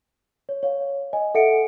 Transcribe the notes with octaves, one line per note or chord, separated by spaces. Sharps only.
C#5
C#5 F5
D#5 G#5
A4 E5 F#5 C#7 D7